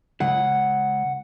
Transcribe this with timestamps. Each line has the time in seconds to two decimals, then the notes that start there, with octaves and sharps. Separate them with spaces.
0.20 C#2 F#5